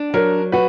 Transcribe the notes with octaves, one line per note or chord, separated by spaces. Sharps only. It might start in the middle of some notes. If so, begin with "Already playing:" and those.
Already playing: D4
F#3 A#4
F#4 B4